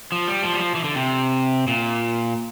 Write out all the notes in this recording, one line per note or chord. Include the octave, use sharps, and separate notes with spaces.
F3
G3
F3
G3
F3
E3
D3
C3
A#2